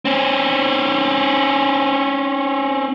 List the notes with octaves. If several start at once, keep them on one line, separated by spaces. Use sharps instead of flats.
C4 C#4